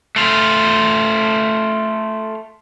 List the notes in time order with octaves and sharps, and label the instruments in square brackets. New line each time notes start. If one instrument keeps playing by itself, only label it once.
[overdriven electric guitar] A3 F4